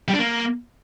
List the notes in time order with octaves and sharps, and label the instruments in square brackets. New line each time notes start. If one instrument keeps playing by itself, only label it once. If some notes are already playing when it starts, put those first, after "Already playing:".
[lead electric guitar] G3
D4
A#3